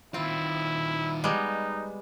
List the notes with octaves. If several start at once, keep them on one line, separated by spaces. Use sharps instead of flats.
D#3 C4 E4 F4
G3 G#3 B3 D#4